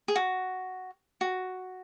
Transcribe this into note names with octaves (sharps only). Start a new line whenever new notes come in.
G#4
F#4
F#4